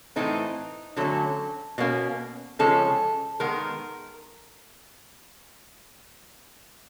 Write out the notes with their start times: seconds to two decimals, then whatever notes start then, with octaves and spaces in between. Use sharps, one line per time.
0.16 A2 E3 A3 C4 D#4
0.97 D3 F#3 A3 C#4 A4
1.78 B2 G3 A#3 C#4
2.59 C#3 F3 G#3 C#4 A4
3.40 D#3 G#3 B3 A#4